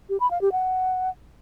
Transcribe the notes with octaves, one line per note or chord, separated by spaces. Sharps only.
G4
B5
F5
G4
F#5